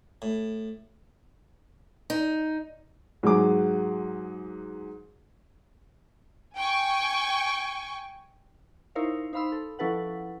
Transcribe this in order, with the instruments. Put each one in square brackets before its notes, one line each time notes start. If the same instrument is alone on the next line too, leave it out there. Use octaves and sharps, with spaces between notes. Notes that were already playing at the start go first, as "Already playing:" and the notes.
[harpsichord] A2
[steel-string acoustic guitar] D#4
[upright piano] G#2 F#3 G#4 D6
[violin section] G5 G#5 C#6
[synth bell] D#4 E4 A#4 C5 C#5 F5
D#4 C5 F5 B5 C6 E6
A4
F3 C#4 E4 A4 B4 F#5